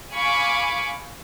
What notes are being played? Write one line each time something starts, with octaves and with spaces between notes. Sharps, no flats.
F5 G#5 B5 C#6 D6